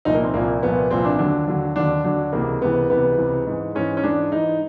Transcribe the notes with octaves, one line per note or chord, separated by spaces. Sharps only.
C2 A#2 F3 D#4
A#3
C4
C2 A#2 F3 A#3
C2 A#2 F3 B3
C2 A#2 F3 C4
D4
D#2 D3 F#3 D4
D#2 D3 F#3
D#2 D3 F#3 D4
D#2 D3 F#3 D4
C#2 C3 E3 A#3
C#2 C3 E3 B3
C#2 C3 E3 B3
C#2 C3 E3
G#2 E3
G#2 E3 C#4
C#4
G#2 E3 D4
G#2 E3 D#4